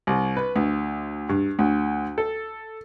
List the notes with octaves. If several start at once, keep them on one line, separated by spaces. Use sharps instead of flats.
C2
B4
D2
G2
D2
A4